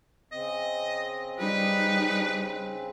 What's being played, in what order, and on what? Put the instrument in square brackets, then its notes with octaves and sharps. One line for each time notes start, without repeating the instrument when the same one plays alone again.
[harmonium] C#3 C4 [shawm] D#5
[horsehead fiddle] G3 D#4 [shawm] B4